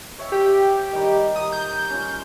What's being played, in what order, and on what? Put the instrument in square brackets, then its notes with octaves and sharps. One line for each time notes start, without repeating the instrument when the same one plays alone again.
[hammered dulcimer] C#5 E5 G5
[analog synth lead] G4
[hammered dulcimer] D#3 G3
[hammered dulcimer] A#5 [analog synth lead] D#6
[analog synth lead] G6
[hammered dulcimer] C#4 F4